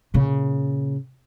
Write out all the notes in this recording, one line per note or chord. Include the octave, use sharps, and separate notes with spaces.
A#2 C#3